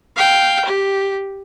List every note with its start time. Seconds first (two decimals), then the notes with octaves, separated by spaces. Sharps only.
0.17 F5 G5
0.65 G4